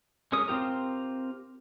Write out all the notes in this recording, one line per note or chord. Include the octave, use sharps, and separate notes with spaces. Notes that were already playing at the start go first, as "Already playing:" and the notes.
G#3 C#4 A#4 D#6
C4 F4 G4 A#4